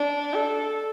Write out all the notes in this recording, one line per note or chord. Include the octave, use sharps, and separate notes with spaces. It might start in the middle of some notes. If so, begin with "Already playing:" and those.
Already playing: D4
A4